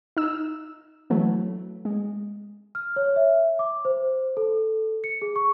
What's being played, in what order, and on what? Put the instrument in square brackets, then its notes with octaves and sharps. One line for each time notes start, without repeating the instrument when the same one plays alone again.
[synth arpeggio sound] D#4 E6
E3 F#3 A3
G#3
[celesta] F6
C#5
E5
D6
C5
A4
C#7
G#4
C#6